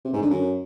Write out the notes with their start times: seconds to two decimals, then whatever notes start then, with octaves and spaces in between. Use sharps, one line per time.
0.05 C3
0.13 G#2
0.22 D3
0.30 F#2